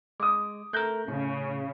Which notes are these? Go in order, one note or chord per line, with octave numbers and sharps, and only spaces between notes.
G#3 D6 D#6
A3 A#4 F#6 G6 A#6
A2 C#3